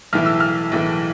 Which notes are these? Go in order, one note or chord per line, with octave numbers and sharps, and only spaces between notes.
B1 A2 E3 F6
E6
F6
B1 A2 E3